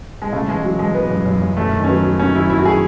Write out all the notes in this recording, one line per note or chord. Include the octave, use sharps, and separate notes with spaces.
G#3
C#3 A3
E3 G#3
E3 F#3
E3 G#3
E3 B3
F#2
F#2
F#2
F#2 A3
D#3
C#4
F#3 B3
F#3
D#3 C#4
F#3 E4
F#3 E4
F#4
G#4